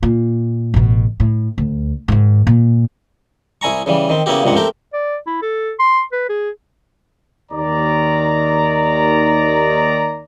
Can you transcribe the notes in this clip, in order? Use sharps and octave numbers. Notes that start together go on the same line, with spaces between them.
A#2
A1 B2
A2
D2
G#2 D#3
A#2
C2 E4 G#5 A#5 C#6
C#3 E3 G3
D#3 C4
C#3 A#3 B3 E4 F#4 G4
C#2 G2 C3 A#3 F#5
A3 C4 G4 A#4
D5
E4
A4
C6
B4
G#4
D#2 D#3 D5 A#5